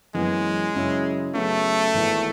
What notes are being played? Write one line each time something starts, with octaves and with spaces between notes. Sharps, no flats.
F#2 E3 G#3 B3
F#2 C#3 F#3 C#4 E4
C#3 F#3 A3 B3
G#1 G#2 E3 B3